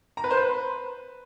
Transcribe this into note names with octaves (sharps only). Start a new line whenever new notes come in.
A#5
B4
C5
B4